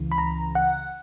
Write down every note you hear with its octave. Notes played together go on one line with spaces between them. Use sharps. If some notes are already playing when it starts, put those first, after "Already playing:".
Already playing: C#2 C#3 E3
B5
A#5
F#5